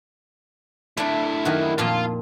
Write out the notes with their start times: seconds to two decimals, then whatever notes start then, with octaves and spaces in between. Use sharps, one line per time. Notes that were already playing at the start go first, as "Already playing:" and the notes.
0.97 A3 D4 E4 D5
1.45 F#2 D#3 F#4
1.78 F2 A#2 F4 A5